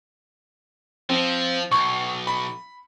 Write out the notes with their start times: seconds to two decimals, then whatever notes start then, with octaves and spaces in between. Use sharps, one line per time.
1.09 F3 C4
1.71 B1 C#6
2.27 B5